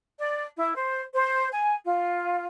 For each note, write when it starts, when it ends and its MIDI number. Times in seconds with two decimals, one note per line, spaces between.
0.19 0.43 74
0.56 0.73 64
0.75 1.02 72
1.13 1.48 72
1.53 1.75 80
1.85 2.45 65